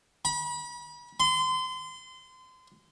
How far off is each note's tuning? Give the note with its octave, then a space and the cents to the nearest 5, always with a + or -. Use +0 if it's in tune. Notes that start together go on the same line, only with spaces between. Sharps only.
B5 -35
C6 -30